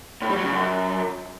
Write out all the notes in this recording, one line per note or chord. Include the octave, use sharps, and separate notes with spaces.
A2
G3
F#3
C#3
F#2